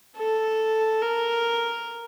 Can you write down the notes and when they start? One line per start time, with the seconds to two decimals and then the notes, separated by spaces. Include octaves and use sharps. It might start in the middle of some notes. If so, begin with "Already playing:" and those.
0.17 A4
1.02 A#4